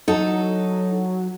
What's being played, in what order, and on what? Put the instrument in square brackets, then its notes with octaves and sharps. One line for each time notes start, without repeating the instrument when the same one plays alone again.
[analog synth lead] F#3 [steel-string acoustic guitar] D#4 A4